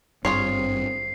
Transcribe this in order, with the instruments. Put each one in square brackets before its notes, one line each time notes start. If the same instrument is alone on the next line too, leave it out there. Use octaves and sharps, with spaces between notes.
[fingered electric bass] G#1 G2 [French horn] C4 [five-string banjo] F4 G#4 C#5 [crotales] C7